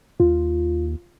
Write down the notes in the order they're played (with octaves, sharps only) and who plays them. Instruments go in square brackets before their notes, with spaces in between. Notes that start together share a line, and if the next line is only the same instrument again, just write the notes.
[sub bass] D#2 [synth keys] F4